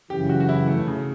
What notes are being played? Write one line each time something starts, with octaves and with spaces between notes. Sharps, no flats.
F#2 C#3 E3 G4
F#4
F#4
E4
A3
C#3